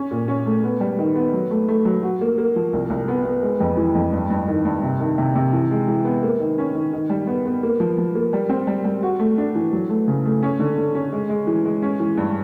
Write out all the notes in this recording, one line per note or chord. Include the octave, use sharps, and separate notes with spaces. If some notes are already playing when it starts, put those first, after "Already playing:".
Already playing: C#4
A#2
C#4
A3
B3
G3
D#3
B3
F#3
A3
A3
F#3
F#4
A#3
A#3
F3
C2
C2
B3
B3
G#3
F2
E3
F2
G2
G2
D#3
G2
C3
D#3
C3
C3
E3
G#3
E3
B3
A#3
D#3
C#4
D#3
D#3
G3
B3
B3
A#3
F3
F3
A#3
G3
C4
G3
G3
F#4
A3
D4
E3
F#3
A3
C#3
A3
C#4
D3
D3
C#4
G#3
G#3
E3
G#3
C#4
E3
G2